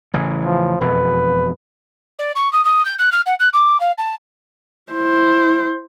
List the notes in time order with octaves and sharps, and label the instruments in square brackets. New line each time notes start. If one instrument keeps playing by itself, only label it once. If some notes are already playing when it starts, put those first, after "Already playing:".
[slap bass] A1 C#3 E3
[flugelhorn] F3
[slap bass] E1 F2 B2 [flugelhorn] B4
[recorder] D5
C#6
D#6
D#6
G6
F#6
F6
F#5
F#6
D6
F5
A5
[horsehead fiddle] E4 C5